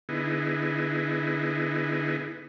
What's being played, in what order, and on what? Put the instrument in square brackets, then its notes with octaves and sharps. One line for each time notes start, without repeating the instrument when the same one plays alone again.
[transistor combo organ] D3 B3 D#4 E4 G#4